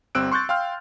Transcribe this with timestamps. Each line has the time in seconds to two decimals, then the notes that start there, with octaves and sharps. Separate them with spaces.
0.15 G1 G3 C4 E6 F#6 D7
0.31 C6 C#6 F#6 G6 A6
0.49 F5 G5 C6 F6